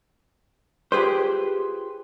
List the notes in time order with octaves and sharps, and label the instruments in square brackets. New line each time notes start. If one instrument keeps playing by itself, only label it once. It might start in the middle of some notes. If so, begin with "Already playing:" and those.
[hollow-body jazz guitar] F4 G4 G#4 B4 C5